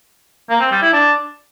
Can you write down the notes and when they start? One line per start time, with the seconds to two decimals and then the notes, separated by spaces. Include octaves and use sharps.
0.49 A#3
0.60 C4
0.71 G3
0.82 E4
0.93 D4